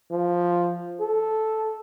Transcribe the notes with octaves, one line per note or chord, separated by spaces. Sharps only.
F3
A4